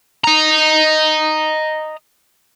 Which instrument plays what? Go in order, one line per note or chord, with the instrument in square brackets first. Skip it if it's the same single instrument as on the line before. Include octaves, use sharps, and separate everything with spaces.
[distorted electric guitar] D#5 A#5